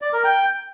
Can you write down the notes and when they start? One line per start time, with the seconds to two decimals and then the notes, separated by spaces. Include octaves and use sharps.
0.02 D5
0.13 A#4
0.24 G5